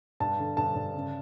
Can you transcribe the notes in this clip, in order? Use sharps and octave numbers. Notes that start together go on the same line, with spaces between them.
G2 A5
D3
G2 A5
G2
C#3